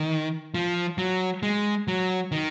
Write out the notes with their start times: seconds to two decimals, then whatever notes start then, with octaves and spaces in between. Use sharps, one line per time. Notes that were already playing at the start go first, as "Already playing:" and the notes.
Already playing: D#3
0.55 F3
0.98 F#3
1.43 G#3
1.88 F#3
2.32 D#3